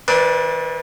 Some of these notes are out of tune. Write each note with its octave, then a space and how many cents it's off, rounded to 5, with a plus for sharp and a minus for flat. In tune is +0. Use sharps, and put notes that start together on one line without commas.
E3 -40 D4 +0 B4 +40